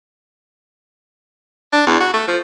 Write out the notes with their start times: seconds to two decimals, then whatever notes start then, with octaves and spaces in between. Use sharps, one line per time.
1.72 D4
1.87 E2
2.01 F#4
2.14 A3
2.28 F3